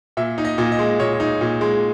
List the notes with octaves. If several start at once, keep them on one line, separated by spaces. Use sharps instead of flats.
A#2 E5
D#4
D#5
A#2
D#5
G#3
A#2 C#5
D#4
A#2
G#3